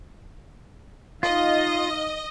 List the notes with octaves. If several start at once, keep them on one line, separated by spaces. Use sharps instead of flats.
D#4 F4 D#5 F5